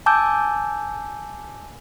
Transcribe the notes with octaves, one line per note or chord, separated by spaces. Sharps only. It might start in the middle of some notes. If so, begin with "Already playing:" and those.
G#5 A5 D6 E6 G6